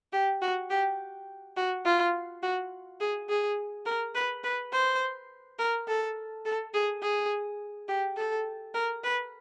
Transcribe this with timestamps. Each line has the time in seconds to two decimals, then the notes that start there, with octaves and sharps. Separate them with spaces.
0.13 G4
0.42 F#4
0.70 G4
1.57 F#4
1.85 F4
2.43 F#4
3.00 G#4
3.29 G#4
3.86 A#4
4.15 B4
4.44 B4
4.73 C5
5.59 A#4
5.88 A4
6.46 A4
6.74 G#4
7.03 G#4
7.89 G4
8.17 A4
8.75 A#4
9.04 B4